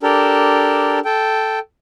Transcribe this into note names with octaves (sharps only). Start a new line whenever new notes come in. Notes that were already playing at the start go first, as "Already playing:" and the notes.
D4 G4 A4 A#4
A4 G5